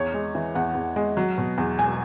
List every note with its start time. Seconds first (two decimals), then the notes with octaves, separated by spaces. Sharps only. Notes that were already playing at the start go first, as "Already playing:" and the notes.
Already playing: E2 C#5
0.14 G#3
0.35 E3
0.55 E2 F#5
0.75 E2
0.96 G#3
1.17 F#3
1.38 B2
1.58 E2
1.78 E1 G#5